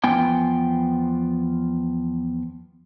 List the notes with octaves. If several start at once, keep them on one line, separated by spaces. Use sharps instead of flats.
E2 F3 B3 G5 G#5